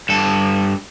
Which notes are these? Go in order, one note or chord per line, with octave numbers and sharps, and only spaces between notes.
G2 A4